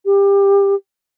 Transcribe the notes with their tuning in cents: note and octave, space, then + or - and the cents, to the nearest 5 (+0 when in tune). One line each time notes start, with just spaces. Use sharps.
G4 +25